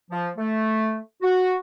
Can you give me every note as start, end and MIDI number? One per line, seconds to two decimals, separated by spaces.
0.11 0.29 53
0.37 0.98 57
1.22 1.55 66